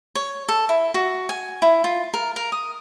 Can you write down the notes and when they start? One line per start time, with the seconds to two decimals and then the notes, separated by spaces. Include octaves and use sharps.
0.15 C#5
0.49 A4
0.69 E4
0.94 F#4
1.29 G#5
1.62 E4
1.84 F4
2.14 A#4
2.36 A#4
2.52 D#6